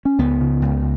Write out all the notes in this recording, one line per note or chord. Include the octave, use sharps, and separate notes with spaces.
C#4
C#2 B3
C#3
C#2